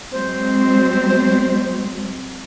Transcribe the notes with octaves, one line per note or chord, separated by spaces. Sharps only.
F#3 G#3 C4 C5